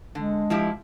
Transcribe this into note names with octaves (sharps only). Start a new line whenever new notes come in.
D3 G#3
F3 E4 G4